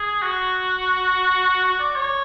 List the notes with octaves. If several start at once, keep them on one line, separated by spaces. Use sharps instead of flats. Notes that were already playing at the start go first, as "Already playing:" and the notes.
Already playing: G#4
F#4
F#4
D5
C#5